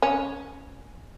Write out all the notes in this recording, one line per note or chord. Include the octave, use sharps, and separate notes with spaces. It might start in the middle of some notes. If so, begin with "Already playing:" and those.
C#4